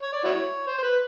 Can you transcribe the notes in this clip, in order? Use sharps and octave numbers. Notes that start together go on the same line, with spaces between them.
C#5
D5
E4 F#4 C#5
C5
C5
B4